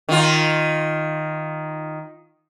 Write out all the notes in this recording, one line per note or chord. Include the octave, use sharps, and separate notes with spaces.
D#3 F4